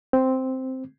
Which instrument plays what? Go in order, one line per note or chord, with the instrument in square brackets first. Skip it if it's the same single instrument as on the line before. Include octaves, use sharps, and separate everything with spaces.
[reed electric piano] C4